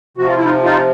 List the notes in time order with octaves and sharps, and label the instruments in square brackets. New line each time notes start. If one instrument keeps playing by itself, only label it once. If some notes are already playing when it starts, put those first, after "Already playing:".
[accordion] C3 F3 F#4
F4
E4
D#4 F4
D#4 F4